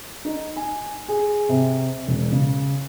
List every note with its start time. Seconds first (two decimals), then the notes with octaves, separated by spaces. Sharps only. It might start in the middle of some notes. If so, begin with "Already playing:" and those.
0.25 D#4
0.56 G#5
1.08 G#4
1.49 C3
2.07 E1
2.32 C#3